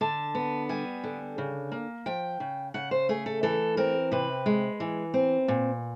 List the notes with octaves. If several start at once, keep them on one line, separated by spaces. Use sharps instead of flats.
D3 A5
B3
G3 G#5
D3
C#3
A#3
F3 G5
C#3
C#3 F#5
C5
A3 G#4
A4
E3 A4
C4 A#4
C3 B4
G#3
E3
C4
A#2